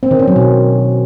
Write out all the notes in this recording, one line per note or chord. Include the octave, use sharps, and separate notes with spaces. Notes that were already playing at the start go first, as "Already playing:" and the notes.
C4
D#3
C#4
F#3
B2